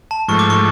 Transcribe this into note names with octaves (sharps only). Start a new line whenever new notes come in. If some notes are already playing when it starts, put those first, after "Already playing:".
A5
G#2 F3 A3 C#6
D6
C#6